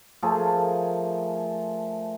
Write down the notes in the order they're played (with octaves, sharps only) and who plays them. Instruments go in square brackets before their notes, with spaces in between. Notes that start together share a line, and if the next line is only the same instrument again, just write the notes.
[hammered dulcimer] F3 A3 G#4 A#4